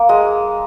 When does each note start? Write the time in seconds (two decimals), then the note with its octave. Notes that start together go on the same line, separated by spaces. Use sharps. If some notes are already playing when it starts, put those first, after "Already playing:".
Already playing: A#3
0.09 G#3